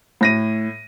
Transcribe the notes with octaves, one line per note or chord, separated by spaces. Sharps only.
A2 A#6 D#7